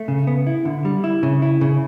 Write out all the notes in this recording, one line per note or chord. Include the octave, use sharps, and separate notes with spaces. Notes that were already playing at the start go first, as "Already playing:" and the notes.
Already playing: A3
C#3
B3
E4
D3
G3
E4
C#3
E4
C#3